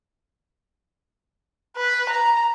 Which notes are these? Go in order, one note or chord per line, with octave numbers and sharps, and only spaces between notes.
B4
A#5